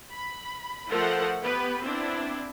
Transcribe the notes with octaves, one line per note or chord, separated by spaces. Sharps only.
B5
F3 A3 A4 A#4 C5 F#5
B3 G4 B4
B3 C4 D4 E4